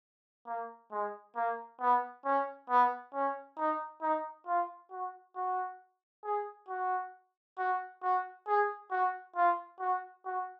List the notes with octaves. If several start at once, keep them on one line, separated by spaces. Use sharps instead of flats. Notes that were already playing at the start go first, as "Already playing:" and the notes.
A#3
G#3
A#3
B3
C#4
B3
C#4
D#4
D#4
F4
F#4
F#4
G#4
F#4
F#4
F#4
G#4
F#4
F4
F#4
F#4